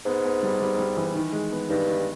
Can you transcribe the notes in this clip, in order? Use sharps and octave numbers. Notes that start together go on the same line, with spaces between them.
G#2 B3
B3
G3
G3
G3
E3
D#3
G#3
B3
G2 D#3
D#3